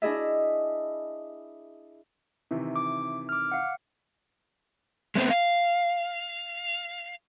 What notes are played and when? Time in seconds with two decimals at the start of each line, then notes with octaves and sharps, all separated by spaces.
0.02 D4 E4 G#4 D#5 E5
2.51 C3 D#3 E3
2.76 D6
3.29 D6 F6
3.52 F5 F#5
5.15 G#3 A3 B3 C4 C5
5.30 F5